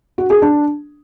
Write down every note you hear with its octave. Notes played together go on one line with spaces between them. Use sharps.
F#4
G#4
D4